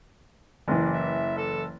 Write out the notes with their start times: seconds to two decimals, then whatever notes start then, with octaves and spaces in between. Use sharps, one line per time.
0.68 F#1 E3
0.92 E5
1.37 A4